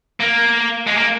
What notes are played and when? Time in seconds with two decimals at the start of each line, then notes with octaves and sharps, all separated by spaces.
0.20 A#3
0.87 G#3
0.97 A#3